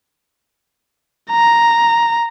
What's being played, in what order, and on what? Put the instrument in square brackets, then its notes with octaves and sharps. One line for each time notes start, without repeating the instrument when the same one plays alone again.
[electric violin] A#5